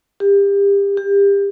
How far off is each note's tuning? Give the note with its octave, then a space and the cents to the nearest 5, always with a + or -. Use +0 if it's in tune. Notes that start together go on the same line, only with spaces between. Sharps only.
G4 +30
G4 +30